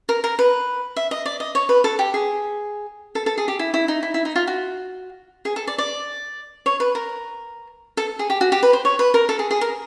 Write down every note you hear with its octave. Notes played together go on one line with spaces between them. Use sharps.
A#4
A#4
B4
E5
D#5
D5
D#5
C#5
B4
A4
G4
G#4
A4
A4
G#4
G4
E4
E4
D#4
E4
E4
D#4
F4
F#4
G#4
A4
D5
D5
C#5
B4
A#4
A4
G#4
G4
F#4
G4
B4
C5
C#5
B4
A#4
A4
G#4
G#4
A#4